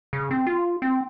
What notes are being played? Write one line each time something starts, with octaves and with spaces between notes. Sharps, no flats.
C#3
C4
F4
C4